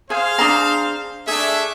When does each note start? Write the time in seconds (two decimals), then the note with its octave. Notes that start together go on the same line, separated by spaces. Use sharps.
0.10 G#4 C5 F5
0.39 D4 G#4 A#5
1.27 A3 D4 G#4 E5